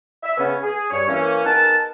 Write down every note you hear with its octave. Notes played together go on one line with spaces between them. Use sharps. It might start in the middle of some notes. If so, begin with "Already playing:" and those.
E5
C#3 B3 C#4
G#4
G2 C#5
E3 A#3 C#4
B3 D#4 G#4 A#4 F#5 A5